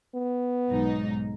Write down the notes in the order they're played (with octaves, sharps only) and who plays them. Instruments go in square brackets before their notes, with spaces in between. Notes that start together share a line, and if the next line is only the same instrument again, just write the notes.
[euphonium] B3
[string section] B1 G#2 D#4